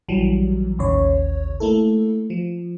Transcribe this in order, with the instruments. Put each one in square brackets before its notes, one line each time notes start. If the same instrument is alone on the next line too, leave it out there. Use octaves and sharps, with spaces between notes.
[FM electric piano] A#1 E3 F#3 G3
A1 D#2 C#3 C#5
A3 A#3 E4 A4
F3